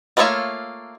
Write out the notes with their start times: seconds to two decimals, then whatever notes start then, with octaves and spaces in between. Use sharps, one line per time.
0.17 A3 A#3 F4 C#5 E5